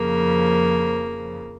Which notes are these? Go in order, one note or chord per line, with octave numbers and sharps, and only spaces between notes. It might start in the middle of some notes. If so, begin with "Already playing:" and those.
Already playing: F2 C#3 F3 A#3